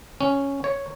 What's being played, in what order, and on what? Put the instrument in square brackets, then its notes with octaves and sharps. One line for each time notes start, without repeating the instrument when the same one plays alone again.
[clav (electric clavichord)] C#4
C#5